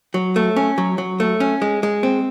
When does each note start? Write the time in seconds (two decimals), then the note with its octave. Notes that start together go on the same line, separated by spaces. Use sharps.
0.14 F#3
0.36 A3
0.56 C#4
0.78 F#3
0.98 F#3
1.20 A3
1.40 C#4
1.62 G#3
1.83 G#3
2.03 C4